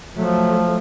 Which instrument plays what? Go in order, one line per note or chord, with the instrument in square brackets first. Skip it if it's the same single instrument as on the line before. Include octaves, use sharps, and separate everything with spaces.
[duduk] F3 [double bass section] F#3 A3